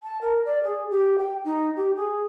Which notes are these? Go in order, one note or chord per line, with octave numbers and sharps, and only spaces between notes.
A5
A#4
D5
G#4
G4
G5
D#4
G4
G#4